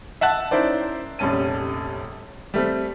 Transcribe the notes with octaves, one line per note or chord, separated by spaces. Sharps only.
E5 F#5 A5 F#6
C#4 D#4 E4 A#4 C5 D5
F1 A#1 G3 C#4 A5 D#7
G3 A3 C4